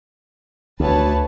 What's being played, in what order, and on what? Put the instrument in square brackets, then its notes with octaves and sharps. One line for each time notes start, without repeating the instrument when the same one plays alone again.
[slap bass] D2 [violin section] B4 C#5 A5